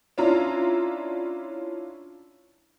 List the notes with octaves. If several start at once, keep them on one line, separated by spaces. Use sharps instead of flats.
C#4 D4 E4 F4 A#5